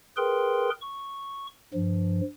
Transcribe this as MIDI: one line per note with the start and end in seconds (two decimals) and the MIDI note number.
0.17 0.70 68
0.17 0.70 70
0.17 0.70 71
0.17 0.70 79
0.17 0.70 84
0.81 1.47 85
1.74 2.21 43
1.74 2.21 53